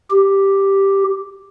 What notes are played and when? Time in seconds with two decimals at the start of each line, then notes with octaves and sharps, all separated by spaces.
0.11 G4